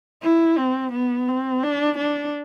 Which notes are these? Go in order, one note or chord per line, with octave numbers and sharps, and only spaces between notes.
E4
C4
B3
C4
D4
D4